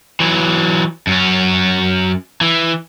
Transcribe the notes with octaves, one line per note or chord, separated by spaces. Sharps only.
E3 F#3
F#2 C#4
E3